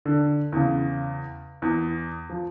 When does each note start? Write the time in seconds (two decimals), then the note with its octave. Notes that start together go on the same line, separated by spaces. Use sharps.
0.05 D3
0.52 E2 C#3
1.62 E2
2.30 F3